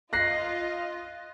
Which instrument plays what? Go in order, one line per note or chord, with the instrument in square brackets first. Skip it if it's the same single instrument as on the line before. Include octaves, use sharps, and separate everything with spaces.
[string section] F4 D#5 [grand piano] F#6 A#6 C7